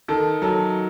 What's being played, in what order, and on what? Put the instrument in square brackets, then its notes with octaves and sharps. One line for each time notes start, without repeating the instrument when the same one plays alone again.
[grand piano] D#3 [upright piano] A4
[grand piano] F#3 [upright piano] A4